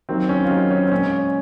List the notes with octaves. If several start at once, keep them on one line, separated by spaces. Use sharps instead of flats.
D#3 F#3 A#3 C4
C#4
F4
D#3 F#3 A#3 D#4
C#4
C4
A#2 G#3 C#4
C#4